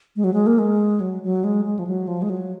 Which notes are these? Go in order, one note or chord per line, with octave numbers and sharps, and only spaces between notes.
G#3
F#3
G#3
A#3
G#3
F#3
F#3
G#3
G#3
F3
F#3
F3
G#3
F#3